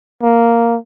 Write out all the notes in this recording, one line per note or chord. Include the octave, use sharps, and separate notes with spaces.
A#3